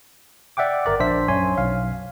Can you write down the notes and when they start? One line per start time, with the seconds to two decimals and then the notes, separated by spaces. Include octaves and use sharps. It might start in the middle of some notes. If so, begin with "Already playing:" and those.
0.57 D5 E5 F#5 G5 D6
0.86 G1 A#4 D5
1.00 A#1 D4 C5 E5 B6
1.28 F#2 C#5 G#5 C6
1.58 B1 F5